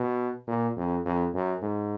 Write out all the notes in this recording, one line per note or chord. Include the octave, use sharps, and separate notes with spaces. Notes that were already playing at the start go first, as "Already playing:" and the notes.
Already playing: B2
A#2
F2
F2
F#2
G#2